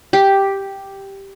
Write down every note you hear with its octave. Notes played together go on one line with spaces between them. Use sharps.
G4